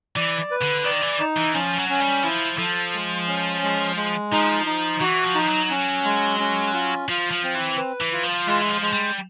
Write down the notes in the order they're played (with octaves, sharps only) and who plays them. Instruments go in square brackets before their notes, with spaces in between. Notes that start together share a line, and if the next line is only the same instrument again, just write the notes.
[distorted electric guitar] E3 [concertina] D5
[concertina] B4
[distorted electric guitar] D3
[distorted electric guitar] D#3 [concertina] D5
[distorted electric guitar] E3
[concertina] D#4
[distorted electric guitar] E3
[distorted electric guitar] F3 [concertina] C#4
[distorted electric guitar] F#3
[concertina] C#4
[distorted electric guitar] G3
[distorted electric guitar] F3 [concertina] E4
[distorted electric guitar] F3 [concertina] A4
[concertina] G#3
C#4
G#3
G#3
[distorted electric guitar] F3 [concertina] D#4
[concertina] D#4
[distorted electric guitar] E3 [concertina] F#4
[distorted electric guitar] F3
[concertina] D#4
[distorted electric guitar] F#3
[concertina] C#4
G#3
C#4
F4
[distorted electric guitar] F3 [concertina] F4
[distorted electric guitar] F3
[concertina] C4
[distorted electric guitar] E3
[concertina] B4
[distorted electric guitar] E3
[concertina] F4
[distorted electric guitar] F3
[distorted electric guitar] E3 [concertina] G#3
[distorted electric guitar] F3
[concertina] G#3
[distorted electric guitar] G3